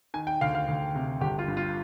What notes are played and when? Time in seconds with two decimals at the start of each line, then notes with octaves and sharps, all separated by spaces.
0.14 D#3 G#5
0.27 G5
0.41 D2 F5
0.55 F5
0.68 D2
0.95 C3
1.21 G1 G4
1.39 F4
1.48 G2
1.57 F4